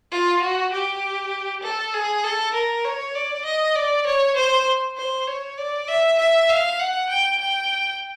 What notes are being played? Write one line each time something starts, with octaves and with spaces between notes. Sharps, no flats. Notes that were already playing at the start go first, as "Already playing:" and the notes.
F4
F#4
G4
A4
G#4
A4
A#4
C#5
D5
D#5
D5
C#5
C5
C5
C#5
D5
E5
E5
F5
F#5
G5
G5